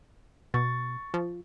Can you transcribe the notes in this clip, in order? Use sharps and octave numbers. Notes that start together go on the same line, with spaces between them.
B2 C#6 A6
F3